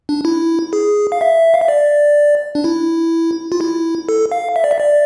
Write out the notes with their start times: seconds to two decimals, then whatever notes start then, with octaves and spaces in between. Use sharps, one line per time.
0.09 D4
0.25 E4
0.73 G#4
1.12 F5
1.21 E5
1.54 F5
1.61 E5
1.68 D5
2.55 D4
2.64 E4
3.52 F4
3.61 E4
4.09 A4
4.32 F5
4.56 E5
4.64 D5
4.71 E5
4.80 D5